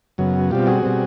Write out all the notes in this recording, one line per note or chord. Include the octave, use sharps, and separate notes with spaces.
F#2 C#3 F#3 B3
B2 G3 C4 F4 G4
F#4 G#4
B2 G3 C4